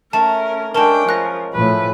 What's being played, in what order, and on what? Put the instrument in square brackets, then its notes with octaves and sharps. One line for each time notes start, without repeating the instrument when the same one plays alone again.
[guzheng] A3 [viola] C#4 A#4 [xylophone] A5
[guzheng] G#3 C#4 [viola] D4 G5 [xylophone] A#4 A5
[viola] F3 A#4 [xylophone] F#6 A#6
[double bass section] A2 F3 [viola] A3 B4